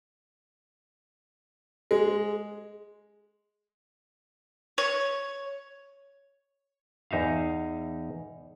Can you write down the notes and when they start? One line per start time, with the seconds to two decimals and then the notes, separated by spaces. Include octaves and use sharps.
1.91 G#3
4.78 C#5
7.11 E2 D#4 E5 F5